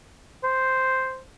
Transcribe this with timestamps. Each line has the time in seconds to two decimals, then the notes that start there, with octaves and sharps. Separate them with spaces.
0.44 C5